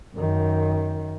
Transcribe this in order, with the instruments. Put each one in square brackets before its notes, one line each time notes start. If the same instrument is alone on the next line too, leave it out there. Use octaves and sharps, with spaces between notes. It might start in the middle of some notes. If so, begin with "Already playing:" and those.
[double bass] F#2 D#3